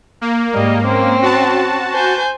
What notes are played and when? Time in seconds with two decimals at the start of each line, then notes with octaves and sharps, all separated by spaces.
0.21 A#3
0.54 G#2 G3 D#5
0.85 C4 C#4
1.22 F#4 A5
1.92 C5 G#5 G6